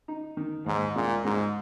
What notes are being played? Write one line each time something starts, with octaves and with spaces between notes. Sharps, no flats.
D#4
D#3
D#2 G#2
A#2 G#3
G#2 G#3